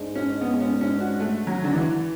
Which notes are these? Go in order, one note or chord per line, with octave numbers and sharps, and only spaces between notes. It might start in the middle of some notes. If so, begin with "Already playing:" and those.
Already playing: G#2 G#3 D4
C#4
B3
C#4
C#4
F#4
A3
F#3
D3
E3